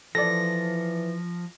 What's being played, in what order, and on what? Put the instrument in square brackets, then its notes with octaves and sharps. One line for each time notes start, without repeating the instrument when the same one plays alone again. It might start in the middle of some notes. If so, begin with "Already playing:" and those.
[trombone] E3 [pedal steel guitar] F3 [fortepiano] A4 D5 [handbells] A#6